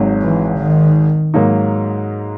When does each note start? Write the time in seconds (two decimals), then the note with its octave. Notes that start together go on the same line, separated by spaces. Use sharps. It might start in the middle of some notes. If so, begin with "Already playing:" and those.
Already playing: G#1 G#2 F#3
0.22 E3
0.59 D#3
1.34 G#2 F#3 A#3 D#4